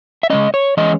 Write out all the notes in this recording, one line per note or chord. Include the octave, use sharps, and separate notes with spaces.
E5
C#3 G#3 C#4 D#5
C#5
E3 G#3 C#4 D#5